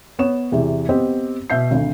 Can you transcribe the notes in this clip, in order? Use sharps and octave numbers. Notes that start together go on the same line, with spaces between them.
B3 C#5 E7
E2 C3 E3
B3 C4 G4 C5 D#5
B2 E5 G6 C7
G#1 D2